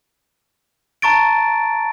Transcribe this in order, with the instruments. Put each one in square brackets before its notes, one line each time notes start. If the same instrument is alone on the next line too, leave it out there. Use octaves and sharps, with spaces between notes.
[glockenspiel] A5 A#5 C#6 A6 D7